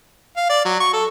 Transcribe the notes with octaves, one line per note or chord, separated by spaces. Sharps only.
F5
D5
F#3
C#6
A4